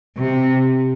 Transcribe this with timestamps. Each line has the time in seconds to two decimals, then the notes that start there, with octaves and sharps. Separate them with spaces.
0.17 C3